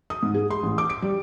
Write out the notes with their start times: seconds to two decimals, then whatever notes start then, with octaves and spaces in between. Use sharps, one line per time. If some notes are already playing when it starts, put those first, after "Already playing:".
0.10 D#6
0.23 G#2
0.34 G#4
0.50 C6
0.63 A1
0.78 D6
0.90 D7
1.02 G3